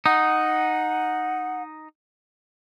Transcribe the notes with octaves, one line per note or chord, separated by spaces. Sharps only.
D#4 F#5